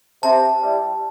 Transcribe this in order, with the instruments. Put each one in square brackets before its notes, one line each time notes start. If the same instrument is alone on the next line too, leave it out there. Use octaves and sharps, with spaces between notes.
[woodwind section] C3 [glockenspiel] A5
[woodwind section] G3 E4